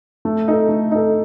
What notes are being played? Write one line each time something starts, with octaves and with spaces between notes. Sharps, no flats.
A3
D#4 A4
A3
D#4 A4